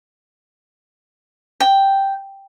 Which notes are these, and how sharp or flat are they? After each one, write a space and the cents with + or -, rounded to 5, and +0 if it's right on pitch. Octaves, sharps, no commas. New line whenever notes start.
G5 +0